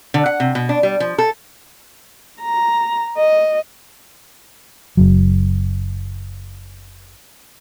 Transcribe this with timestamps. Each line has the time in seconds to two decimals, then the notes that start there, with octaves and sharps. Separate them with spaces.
0.14 D3
0.26 F#5
0.40 C3
0.55 B2
0.69 D4
0.83 G3
1.00 F3
1.18 A4
2.42 A#5
3.18 D#5
4.97 F#1 F#3